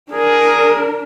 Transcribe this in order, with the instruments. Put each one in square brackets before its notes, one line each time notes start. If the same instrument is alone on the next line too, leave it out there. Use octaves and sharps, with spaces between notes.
[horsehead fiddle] D4 A#4 [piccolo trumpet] G#4